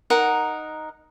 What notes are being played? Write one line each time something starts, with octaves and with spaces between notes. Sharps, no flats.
D#4 A#4 F#5